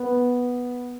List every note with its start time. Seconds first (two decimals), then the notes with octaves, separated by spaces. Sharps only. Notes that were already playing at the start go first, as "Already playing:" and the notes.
Already playing: B3